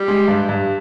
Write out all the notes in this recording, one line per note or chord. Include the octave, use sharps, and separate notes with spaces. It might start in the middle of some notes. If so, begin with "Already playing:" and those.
Already playing: G3
G#3
G2
G2